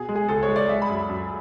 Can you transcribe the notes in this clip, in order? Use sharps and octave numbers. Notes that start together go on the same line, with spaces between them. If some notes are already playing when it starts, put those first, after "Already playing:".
Already playing: B2 G#4
G#3
G#4
C#2 A4
C#5
G#3
D5
G#3 E5
B5
F#2
B5
F#2